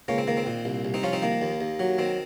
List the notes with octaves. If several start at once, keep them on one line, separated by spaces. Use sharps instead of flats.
C#2 A#3 C#4
C4
D#3 A#3
C4
A#2
C2
C2
C4 D#4
F3 C#4 F4
C4 D#4
D#3 A#3
D#2
D#2
F#3
D#3 C4